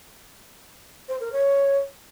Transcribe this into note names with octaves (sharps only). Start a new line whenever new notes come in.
C5
A#4
C#5